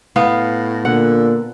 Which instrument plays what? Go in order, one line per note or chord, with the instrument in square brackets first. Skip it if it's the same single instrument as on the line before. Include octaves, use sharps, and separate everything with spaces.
[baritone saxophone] A2 [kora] B3 F5
[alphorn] A#2 [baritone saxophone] D3 [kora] F#5